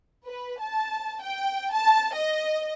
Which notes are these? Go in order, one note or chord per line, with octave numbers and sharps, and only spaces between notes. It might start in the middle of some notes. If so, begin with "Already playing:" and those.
B4
A5
G5
A5
D#5